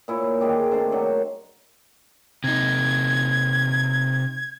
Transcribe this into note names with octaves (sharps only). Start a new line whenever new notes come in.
A#2 E4 C#5
D#3 G#3 G4
C3 A3 D4 C5
D#3 F#3
C3 D#4 G#6